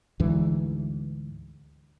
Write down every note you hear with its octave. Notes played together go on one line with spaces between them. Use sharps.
D2 G#2 E3